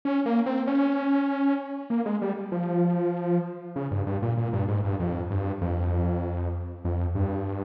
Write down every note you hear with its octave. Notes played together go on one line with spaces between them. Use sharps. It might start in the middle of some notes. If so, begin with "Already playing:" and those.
C#4
A#3
C4
C#4
A#3
G#3
G3
F3
C#3
G2
G2
A#2
A#2
G2
G#2
G2
F2
G2
F2
F2
G2